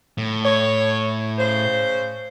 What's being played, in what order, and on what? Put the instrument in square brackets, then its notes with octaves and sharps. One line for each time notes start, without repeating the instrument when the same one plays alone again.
[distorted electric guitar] A2
[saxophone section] C#5
C#3 C5